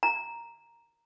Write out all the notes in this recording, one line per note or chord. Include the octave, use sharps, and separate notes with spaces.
A#5